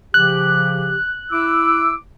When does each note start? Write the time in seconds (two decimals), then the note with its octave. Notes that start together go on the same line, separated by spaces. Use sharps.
0.14 C#3 F3 G4 F#6
1.31 E4 D6 E6